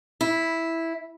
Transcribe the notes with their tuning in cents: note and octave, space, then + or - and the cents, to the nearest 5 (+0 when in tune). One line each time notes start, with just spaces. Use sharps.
E4 -5